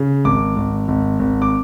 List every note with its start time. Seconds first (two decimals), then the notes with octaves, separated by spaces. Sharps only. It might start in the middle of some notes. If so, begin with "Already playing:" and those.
Already playing: C#3
0.25 G#1 D6
0.56 G#1
0.88 G#1
1.19 G#1
1.42 D6